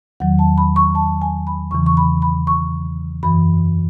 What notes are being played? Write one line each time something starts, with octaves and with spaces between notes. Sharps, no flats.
E2 D#3 F#3 F#5
A5
B5
C#6
A5
G#5
B5
E2 C#3 E3 C#6
C#6
B5
B5
C#6
F#2 E3 B5